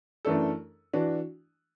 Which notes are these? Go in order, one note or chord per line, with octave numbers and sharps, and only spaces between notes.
F#2 E3 A3 D4 A4
E3 D4 F#4